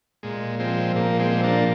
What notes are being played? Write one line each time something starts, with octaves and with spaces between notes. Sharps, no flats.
A#2 G#3
F3 G#3 C4
A#2 A#3
G#3 C4
F3
A#3 D4